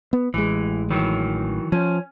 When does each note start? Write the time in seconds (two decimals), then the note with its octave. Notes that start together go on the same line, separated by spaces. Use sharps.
0.13 B3
0.34 A1 E3 G#3
0.91 D#3 E3 F#3
1.72 F3 C#4